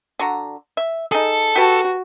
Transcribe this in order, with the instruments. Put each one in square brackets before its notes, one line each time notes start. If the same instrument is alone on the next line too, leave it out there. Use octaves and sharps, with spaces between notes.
[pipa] D3 F#4 A#5
E5
[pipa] D#4 G#4 [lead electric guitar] A4
[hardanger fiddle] F#4 [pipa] G4 B4 A5